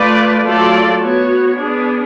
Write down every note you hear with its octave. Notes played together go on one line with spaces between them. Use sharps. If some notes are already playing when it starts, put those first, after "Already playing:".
Already playing: A3 F4 B4 D5
F#3 A3 F4 A4 D5
B3 F#4 C#5
B3 D4 G#4